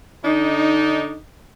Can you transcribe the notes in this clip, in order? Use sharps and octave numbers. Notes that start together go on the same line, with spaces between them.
D3 D4 D#4